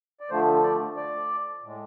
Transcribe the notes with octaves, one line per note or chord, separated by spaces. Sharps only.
D5
D3 F3 A3 C5
D5
D5
A2 G#3